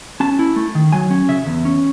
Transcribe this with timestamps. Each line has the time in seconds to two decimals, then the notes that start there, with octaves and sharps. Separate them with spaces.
0.20 C#4 A5
0.39 E4
0.56 A3
0.75 D#3
0.93 F#3 G#5
1.11 C#4
1.28 C#3 E5
1.46 E2
1.65 C#4